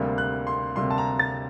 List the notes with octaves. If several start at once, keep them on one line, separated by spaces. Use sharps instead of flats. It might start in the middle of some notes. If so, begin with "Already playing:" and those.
Already playing: D2 C3 G3 A#3
F#6
C6
D2 C3 G3 A#3 C6
A5
A#5
A6